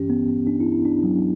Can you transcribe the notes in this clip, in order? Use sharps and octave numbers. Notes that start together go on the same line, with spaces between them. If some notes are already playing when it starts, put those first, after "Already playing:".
Already playing: G2 E3 C#4 G4
B3
C#4
D4
E4
E4
D4
F#3